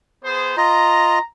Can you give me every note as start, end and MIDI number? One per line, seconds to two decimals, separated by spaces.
0.23 0.54 59
0.23 0.54 68
0.23 0.54 72
0.57 1.19 65
0.57 1.19 75
0.57 1.22 82